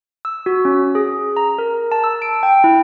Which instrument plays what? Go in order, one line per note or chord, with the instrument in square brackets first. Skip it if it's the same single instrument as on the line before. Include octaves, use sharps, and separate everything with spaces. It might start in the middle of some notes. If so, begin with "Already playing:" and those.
[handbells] E6
F#4
C#4
G#4
A#5
A#4
A5
E6
D7
G5
E4